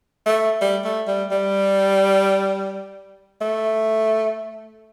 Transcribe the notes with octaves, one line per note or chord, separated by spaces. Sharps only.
A3
G3
A3
G3
G3
A3